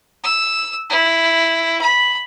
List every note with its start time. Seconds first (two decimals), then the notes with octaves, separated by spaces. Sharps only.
0.24 E6
0.90 E4
1.81 B5